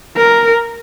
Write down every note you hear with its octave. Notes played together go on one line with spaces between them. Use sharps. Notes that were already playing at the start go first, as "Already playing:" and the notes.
A#4